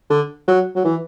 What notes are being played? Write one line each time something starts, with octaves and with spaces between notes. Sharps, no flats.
D3
F#3
F#3
E3